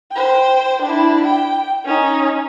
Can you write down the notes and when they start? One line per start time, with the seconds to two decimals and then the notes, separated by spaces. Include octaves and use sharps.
0.12 C5 G5
0.82 D4 E4
1.25 G5
1.85 C#4 D#4